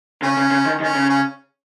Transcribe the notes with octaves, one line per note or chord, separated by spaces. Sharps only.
C#3 C#4
C#3
C#3
D#3
D#3 C#4
C#3
C#4